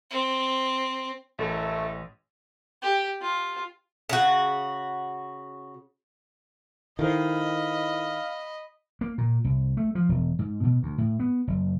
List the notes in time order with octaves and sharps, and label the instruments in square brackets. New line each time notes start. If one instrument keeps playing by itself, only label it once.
[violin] C4
[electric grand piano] A1 [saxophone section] F#2 A3
[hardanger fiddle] G4
F4
[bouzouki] C#3 F#4
[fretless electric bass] D#3 [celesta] E4 A4 C5 [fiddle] D#5 B5 [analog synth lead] F5
[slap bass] A#3
A#2
C2
A3
F3
E1
G#2
B2
D2
A2
B3
F#1